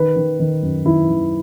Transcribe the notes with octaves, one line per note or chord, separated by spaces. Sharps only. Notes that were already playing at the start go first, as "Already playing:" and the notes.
Already playing: D#3 B4
D#3
D#3
F#2
D#3 E4
D#3